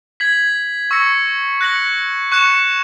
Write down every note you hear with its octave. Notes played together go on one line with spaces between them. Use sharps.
G#6 B6 F#7
C#6 E6 A#6 C#7
F#6 A#6 C#7 F#7
C#6 F#6 C#7 E7